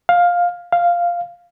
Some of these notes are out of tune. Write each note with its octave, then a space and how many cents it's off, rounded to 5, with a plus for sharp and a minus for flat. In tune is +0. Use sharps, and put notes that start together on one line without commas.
F5 +10
F5 -5